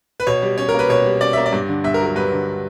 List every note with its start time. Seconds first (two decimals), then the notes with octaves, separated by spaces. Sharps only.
0.20 B4
0.27 B2 C#5
0.42 G3
0.58 C#4 C#5
0.69 A#4
0.74 A#3 B4
0.89 B2 C#5
1.05 G3
1.21 C#4 D5
1.33 A#3 E5
1.46 D5
1.53 G2
1.68 D3
1.84 G2 E5
1.94 A#4
2.00 F#3
2.06 A#4
2.16 G2 B4
2.32 D3